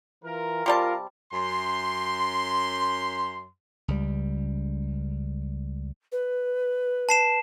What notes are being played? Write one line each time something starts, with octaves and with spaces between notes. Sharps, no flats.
E3 F4 A#4
C3 G3 F4 A#4 A5
F#2 C6
C#2 G3
B4
A5 C7 E7